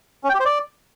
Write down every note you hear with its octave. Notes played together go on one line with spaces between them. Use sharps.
C#4
G5
G4
C5
D5